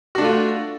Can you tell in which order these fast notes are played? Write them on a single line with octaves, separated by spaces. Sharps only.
F#4 D4 A3 F4